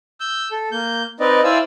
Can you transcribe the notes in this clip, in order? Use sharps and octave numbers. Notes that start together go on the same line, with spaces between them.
E6 G6
A4
A#3 G6
C4 D#4 B4 D5 D#5
E4 C5 D5 F5 G#5 E6